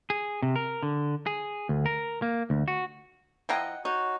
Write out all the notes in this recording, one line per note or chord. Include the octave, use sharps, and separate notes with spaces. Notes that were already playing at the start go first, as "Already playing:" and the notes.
G#4
C3
A#4
D3
G#4
D2
A#4
A#3
D2
F#4
F3 E4 D#5 F#5 G5 A#5
D#4 F#4 C#5